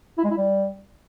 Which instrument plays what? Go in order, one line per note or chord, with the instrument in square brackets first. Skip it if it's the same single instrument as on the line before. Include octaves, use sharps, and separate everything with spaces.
[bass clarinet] E4
G#3
E4
G3